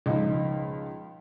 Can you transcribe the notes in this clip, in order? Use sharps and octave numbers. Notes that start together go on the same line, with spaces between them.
C#2 F3 D#4